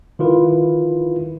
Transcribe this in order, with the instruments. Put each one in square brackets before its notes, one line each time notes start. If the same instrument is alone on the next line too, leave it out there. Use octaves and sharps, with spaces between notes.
[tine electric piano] D#3 E4 F4 B4